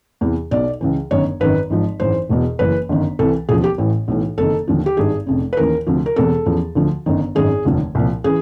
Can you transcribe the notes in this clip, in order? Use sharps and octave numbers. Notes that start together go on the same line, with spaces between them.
E2 C3 E3
B1 B2 D5
C#2 C#3 E3
G1 F#2 D#3 C#5
G#1 F#2 D#3 B4
G#1 G#2 F3
G#1 F#2 C#3 E3 C5
E1 E2 B2
F#1 F#2 C#3 E3 B4
G1 F#2 D#3
C2 C3 E3 A4
E1 D#2 C#3 F3 G#4
G4
A1 A2 E3
B1 A2 E3
F#1 F2 C3 D#3 A4
D#2 D3 F3
G4
G#1 G2 D#3 G#4
F1 F2 C#3
B4
D#2 C#3 E3 A#4
D2 C3 F3
A#4
E1 E2 C3 E3 A4
E2 C#3 F3
D2 D3 F3
G1 F#2 D#3
G#1 F#2 D#3 G#4
F1 D#2 D3 F3
C2 A#2 F3
C#3 E3 G#4